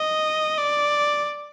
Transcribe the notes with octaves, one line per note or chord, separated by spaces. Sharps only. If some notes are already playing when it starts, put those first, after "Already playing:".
Already playing: D#5
D5